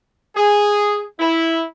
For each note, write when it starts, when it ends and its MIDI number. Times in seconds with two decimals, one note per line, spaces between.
0.35 1.03 68
1.19 1.64 64